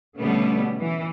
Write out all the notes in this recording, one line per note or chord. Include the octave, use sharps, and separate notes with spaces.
B2 D3 G3 A3 B3 C#4
E3